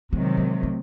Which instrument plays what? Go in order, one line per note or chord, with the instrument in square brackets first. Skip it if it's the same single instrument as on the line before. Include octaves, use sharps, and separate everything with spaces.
[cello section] C3 D#3 F#3 [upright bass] G#3
[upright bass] G#3
A3